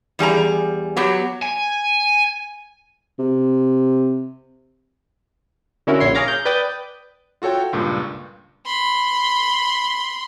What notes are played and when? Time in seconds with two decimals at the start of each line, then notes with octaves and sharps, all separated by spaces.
0.19 E2 G3 G#4 A#5
0.97 F#3 B3 G4
1.43 G#5
3.19 C3
5.87 D3 D#3 C#4 E4 F#4 A#4
6.00 A#1 C#5 C6
6.15 G#4 C#5 F5 A#5 D6
6.28 G6
6.45 B4 D5 G5 D#6 G6
7.42 F4 F#4 A4 C#5 G5
7.73 C#2 G2 A#2
8.66 B5 C6